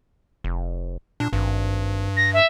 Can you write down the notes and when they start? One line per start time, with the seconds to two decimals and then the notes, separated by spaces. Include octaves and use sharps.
0.44 F1
1.20 A#2 D4
1.33 G#1 G2
2.17 A#6
2.34 E5